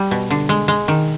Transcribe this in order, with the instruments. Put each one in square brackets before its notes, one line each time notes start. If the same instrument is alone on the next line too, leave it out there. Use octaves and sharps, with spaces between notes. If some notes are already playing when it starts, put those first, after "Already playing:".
Already playing: [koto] G3
B2
D3
G#3
G#3
D#3